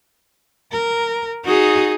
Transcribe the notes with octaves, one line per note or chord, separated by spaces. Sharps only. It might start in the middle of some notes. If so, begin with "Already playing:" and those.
A#4
D#4 F#4 G#4